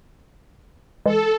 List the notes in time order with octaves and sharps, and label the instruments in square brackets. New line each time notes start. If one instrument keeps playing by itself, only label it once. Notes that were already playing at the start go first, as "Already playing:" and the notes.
[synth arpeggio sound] E3 G#3 [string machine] A4